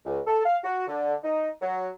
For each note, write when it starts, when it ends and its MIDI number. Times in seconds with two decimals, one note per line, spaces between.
0.05 0.20 37
0.27 0.42 69
0.45 0.57 77
0.64 0.87 66
0.87 1.15 50
1.23 1.50 63
1.61 1.89 54